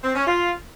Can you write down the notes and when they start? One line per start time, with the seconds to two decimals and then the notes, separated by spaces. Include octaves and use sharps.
0.04 C4
0.15 C#4
0.27 F4